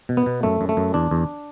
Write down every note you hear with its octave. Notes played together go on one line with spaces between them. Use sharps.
B2
B3
B2
F#2 A3
F#2
A3
F#2
E2 D4
E2